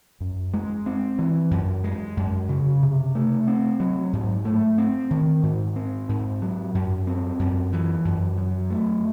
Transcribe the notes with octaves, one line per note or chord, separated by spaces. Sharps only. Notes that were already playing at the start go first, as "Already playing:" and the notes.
F#2
G#3
C4
E3
F#2
G#3
F#2
C#3
C3
A3
C4
F#3
G#2
A3
C4
D#3
G#2
C4
G#2
F#3
F#2
C4
F#2
E3
F#2
F#3
A3